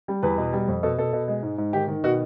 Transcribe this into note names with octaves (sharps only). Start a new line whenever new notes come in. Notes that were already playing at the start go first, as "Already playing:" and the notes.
G3
E2 B4
B2
G3
F2
B2 A4
B2 A4
B2
G#3
G#2
G#2
D#3 G4
D#3
B2 F#4